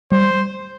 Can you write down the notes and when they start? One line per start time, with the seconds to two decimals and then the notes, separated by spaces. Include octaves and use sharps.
0.12 G3 C5